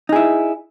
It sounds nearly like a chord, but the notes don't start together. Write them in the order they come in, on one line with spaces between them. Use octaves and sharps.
D#4 G#4 E4